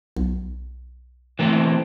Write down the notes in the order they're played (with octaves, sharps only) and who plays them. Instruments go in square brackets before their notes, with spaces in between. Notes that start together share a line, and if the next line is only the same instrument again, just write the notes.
[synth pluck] B1
[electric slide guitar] E3 A3 C4